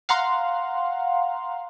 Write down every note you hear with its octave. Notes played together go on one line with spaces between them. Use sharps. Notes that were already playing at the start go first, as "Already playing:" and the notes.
F5 F#5 A#5 C6